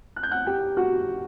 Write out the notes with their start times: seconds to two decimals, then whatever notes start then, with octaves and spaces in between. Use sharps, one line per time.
0.16 F#6
0.23 G6
0.31 F#5 F#6
0.47 G4 G5
0.77 F#4 F#5